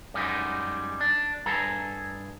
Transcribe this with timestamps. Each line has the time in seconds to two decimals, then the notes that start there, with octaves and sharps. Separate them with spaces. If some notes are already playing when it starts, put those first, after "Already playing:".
0.14 F#2 G3 G#3 D#4
1.01 D4
1.46 G2 G#4 A4 A#5